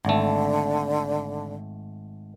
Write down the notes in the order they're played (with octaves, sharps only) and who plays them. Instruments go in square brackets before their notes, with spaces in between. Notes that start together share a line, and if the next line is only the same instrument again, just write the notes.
[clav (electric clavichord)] G#1 A3 [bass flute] D3